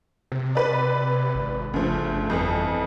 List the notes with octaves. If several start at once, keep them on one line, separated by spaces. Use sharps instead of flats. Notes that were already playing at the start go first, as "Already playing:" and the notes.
C3
B4 D5
G#1
G1 D2 C#3 F3
F2 E3